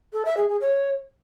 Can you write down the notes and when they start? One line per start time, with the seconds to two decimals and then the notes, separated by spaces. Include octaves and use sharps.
0.13 A4
0.25 E5
0.37 G#4
0.49 G#4
0.61 C#5